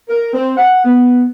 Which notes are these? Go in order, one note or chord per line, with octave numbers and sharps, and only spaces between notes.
A#4
C4
F#5
B3